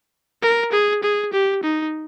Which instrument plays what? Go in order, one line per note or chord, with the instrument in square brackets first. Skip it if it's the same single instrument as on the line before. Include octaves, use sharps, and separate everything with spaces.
[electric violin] A#4
G#4
G#4
G4
D#4